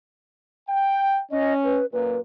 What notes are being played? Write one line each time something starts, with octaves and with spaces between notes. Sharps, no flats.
G5
C#4 D#5
B4
F#2 A#2 B4